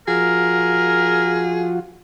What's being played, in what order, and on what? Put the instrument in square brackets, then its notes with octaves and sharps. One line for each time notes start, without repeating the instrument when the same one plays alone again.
[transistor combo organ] F3 F4 F#4 [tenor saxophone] G#4 [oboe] A#4